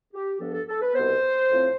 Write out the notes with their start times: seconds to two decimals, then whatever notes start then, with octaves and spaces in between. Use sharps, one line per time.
0.13 G4
0.40 G2 F3 B3 D4 A4
0.54 A4
0.68 A4
0.82 B4
0.94 C2 B2 B3 C5
1.49 A2 F3 C4